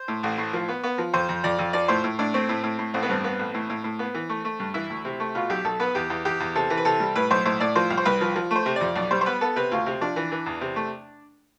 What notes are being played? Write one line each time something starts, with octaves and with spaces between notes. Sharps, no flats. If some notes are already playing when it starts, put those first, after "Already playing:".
Already playing: C5
A2
A1
A2
F3
B3
B3
F3
F2 C5
F2
F2 D5
F2
F3 D5
A2 C5
A2
A2 D4
A3 C4
A2
A2
A2
A1 C4
B3
G2 C4
B3
A1
A2
A2
A2
B3
E3
A3
A3
G2
E3 E4
D2
C3
A3
B2 F4
B1 G4
B1 A4
B3 B4
E2 G4
E2
E2 G4
E2
C3 A4
E3
B4
C3 A4
G3
A2 B4
B1 C5
A2 C5
A2 D5
F3 C5
C2
C5
C2 B4
F3
F3
A3 C5
C3
F2 D5
B1 D5
G3 C5
C5
B3 B4
B3 A4
C3 B4
D2 F4
C3
F3 D4
E3
E3
E2
C3
A3